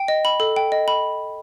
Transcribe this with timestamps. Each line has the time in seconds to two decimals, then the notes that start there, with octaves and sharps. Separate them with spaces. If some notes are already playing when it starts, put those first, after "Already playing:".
Already playing: G5
0.08 D#5
0.25 B5
0.40 A4
0.56 G5
0.72 D#5
0.88 B5